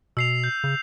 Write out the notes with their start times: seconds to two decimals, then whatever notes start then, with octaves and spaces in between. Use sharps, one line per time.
0.17 B2 E6 C7 F7
0.44 G6
0.64 C#3